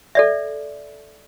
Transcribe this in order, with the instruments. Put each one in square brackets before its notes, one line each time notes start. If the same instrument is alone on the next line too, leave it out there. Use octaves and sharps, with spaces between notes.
[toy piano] A4 D5 E5